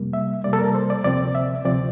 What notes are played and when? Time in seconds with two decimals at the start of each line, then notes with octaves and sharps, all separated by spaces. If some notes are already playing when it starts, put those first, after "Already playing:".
Already playing: F2 C3 G3 A#3
0.13 E5
0.44 F2 C3 G3 A#3 D5
0.53 A4
0.59 A#4
0.75 C5
0.90 D5
1.04 D2 C3 F3 C4 D5
1.35 E5
1.65 D2 C3 F3 C4 D5